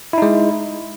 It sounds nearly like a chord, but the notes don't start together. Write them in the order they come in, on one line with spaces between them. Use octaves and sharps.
E4 D#4 G#3